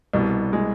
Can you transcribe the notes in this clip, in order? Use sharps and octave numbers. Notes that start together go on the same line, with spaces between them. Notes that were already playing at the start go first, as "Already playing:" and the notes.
C2 B2 G3
G#3